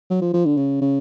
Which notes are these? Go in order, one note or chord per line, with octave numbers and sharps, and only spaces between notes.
F#3
F3
F3
D3
C#3
C#3